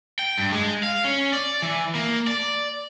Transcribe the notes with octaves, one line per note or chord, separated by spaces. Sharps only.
G5
G2
G#3
F5
C#4
D5
E3
A#3
D5